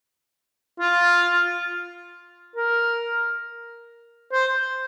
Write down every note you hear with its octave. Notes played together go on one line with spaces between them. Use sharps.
F4
A#4
C5